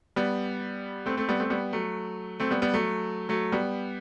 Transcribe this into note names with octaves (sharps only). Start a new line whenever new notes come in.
G3 B3
A3 C4
A3 C4
G3 B3
A3 C4
G3 B3
F#3 A3
A3 C4
G3 B3
G3 B3
F#3 A3
F#3 A3
G3 B3